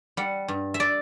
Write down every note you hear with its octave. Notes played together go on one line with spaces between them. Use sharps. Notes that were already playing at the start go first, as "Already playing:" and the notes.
G3 F#5
G2
E5
D5